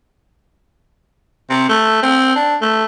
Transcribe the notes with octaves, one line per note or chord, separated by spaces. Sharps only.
C3
A3
C4
D4
A3